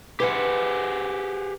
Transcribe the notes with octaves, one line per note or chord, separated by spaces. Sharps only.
G4 G#4 B4 C5 E5 F#5